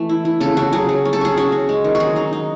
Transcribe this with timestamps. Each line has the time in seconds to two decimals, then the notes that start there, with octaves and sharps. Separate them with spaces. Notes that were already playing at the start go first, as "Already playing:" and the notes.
Already playing: E3 A3
0.09 E4
0.25 E4
0.40 C#3 A4
0.57 C#3 F#4
0.73 F#3 G#4
0.89 F#3
1.05 C#4
1.13 A4
1.21 C#4 G#4
1.37 C#4 F#4
1.52 C#4
1.69 G#3
1.84 D#3
1.95 F#4
2.00 F#3 G#4
2.16 D#4
2.33 D#4